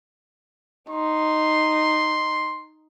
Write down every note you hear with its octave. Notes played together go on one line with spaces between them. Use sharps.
D#4 C6